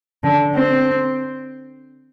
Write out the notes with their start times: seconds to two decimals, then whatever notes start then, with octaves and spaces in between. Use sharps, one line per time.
0.23 D3
0.55 C4